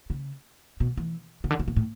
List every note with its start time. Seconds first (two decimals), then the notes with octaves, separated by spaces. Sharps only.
0.10 C#3
0.80 B2
0.97 E3
1.44 C#3
1.50 D3
1.60 C#3
1.68 B2
1.76 A2